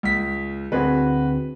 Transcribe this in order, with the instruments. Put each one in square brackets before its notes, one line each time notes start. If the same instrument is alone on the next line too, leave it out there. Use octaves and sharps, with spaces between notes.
[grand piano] C#2 B6
[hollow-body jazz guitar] D2 C4 G#4 [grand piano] F#4 B4